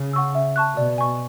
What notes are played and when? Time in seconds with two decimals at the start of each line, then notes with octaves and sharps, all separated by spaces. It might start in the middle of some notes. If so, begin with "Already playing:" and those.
Already playing: C#3
0.13 F#5 C#6 E6
0.35 E5
0.56 A5 C#6 F#6
0.77 B2 D5
0.98 G#5 C#6